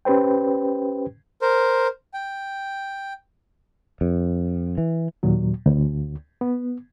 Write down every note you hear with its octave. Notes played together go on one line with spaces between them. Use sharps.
C#4 G4 B4 C5 G5
A#4 C5
G5
F2
E3
D#2 A#2 F#3
D2
B3